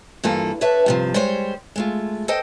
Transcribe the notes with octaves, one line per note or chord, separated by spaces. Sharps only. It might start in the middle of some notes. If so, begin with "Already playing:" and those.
G2 E3 A#3 F4 A4
D4 B4 C#5 E5 A5
G2 C3 F3
G3 G#3 G4 C5 C#5
G#3 A3 F4
A4 C5 D#5 G5